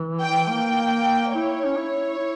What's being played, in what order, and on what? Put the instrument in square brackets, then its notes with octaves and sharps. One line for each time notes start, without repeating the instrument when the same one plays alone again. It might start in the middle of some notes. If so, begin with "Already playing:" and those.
Already playing: [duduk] E3
[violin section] G5
[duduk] A#3 [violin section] G5
[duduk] E4 [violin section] C#5
[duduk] C#4
E4
E4